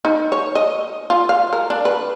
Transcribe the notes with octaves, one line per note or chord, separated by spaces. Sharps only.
D#4
C#5
D#5
F4
F5
A#4
D4
B4